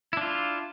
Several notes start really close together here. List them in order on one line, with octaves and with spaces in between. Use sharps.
E4 D4 F4